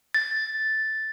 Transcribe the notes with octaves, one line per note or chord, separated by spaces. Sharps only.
A6